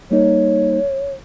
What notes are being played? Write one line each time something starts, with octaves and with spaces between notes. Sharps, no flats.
G3 A#3 D#4 C#5